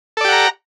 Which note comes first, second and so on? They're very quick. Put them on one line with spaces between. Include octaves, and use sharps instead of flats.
A4 D5 G4 F#5 A#5